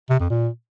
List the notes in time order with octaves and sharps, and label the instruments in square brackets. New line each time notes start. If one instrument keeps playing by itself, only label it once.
[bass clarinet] C3
F2
A#2